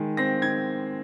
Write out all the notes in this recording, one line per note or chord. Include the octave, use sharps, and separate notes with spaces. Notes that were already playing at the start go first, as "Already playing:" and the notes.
Already playing: D#3 G#3
C4 A#6
D#3 G#6